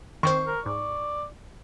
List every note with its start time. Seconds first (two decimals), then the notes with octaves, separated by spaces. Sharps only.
0.23 D#3 C4 C5 C#6
0.47 A#4
0.66 G#2 D5